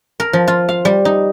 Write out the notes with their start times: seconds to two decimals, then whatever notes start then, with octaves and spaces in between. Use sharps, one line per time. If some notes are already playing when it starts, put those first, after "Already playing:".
0.20 A#4
0.33 F3
0.48 F4
0.69 F5
0.85 G3
1.05 D#4